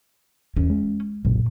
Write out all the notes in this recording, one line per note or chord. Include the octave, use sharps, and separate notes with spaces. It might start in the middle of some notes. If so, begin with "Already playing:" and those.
E2 C#4
G#3
F#1 B1 A#2